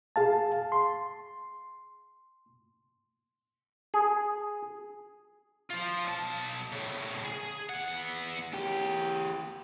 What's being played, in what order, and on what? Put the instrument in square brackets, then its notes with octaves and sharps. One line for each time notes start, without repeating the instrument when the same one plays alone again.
[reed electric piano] G#4 F5 A5
C6
[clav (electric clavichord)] G#4
[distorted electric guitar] F3 F4
B1 A5
A2 C#3
G#4
E2 F#5
[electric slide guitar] E2 G4